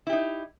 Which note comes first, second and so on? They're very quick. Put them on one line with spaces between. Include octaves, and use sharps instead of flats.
E4 G4 D#4